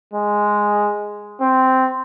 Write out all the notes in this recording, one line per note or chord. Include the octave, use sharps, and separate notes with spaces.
G#3
C4